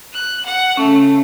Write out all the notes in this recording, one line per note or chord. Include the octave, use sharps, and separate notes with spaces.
F#6
F#5
C#3 A3 C#4